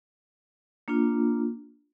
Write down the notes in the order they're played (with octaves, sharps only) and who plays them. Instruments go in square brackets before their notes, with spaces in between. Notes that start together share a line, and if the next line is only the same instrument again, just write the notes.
[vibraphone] A#3 D4 F4